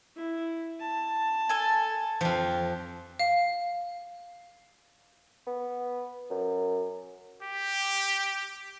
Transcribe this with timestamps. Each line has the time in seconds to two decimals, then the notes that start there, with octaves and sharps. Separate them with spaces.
0.17 E4
0.80 A5
1.49 A4 G#5
2.21 F2 F3 G4
3.19 F5
5.47 B3
6.30 F#2
7.43 G4